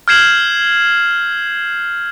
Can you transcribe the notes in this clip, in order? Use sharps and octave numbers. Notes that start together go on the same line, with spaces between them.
F6 G6 G#6 C7 E7 F#7